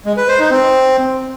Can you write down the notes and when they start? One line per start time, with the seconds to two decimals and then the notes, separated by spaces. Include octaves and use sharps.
0.06 G#3
0.17 B4
0.28 C5
0.40 D#4
0.51 C4